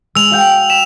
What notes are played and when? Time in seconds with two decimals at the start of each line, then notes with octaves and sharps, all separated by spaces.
0.15 G#3 E6 F7
0.31 F#4 F5 G5
0.70 B6 E7